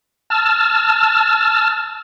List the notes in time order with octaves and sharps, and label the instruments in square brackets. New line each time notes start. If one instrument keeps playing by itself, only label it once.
[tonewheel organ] A5 E6 F6